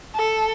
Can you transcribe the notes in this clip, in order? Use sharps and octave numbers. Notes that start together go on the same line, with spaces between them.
A4